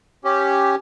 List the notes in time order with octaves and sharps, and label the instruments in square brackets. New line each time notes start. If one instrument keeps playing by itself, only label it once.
[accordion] C#4 G4